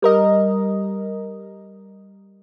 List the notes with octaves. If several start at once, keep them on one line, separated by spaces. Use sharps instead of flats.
G3 A#4 D#5